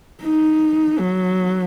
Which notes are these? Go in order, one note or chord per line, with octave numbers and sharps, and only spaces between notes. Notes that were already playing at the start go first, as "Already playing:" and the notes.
D#4
F#3